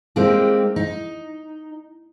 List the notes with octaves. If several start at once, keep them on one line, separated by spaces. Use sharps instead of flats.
G#3 A#3 C4 D#4 G4
D#4